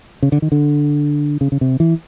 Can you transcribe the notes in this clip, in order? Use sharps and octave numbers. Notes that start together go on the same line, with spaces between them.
C#3
D3
D#3
D3
C#3
C#3
C3
E3